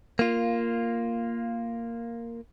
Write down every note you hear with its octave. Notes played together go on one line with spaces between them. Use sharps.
A#3 F4